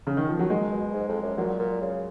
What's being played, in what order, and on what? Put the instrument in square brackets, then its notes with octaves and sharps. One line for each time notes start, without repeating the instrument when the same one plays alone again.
[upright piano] C#3
D#3
F3
F#3
[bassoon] D#3 [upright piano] G#3
[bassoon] B2
G#2
F2
F#2
[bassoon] A#2 [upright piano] F#3
[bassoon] A#2
C#3